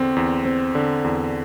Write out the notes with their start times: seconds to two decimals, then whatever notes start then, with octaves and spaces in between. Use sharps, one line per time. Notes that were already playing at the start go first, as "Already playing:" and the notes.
Already playing: E2 D3 C4
0.16 E2
0.45 C4
0.75 D3
1.04 E2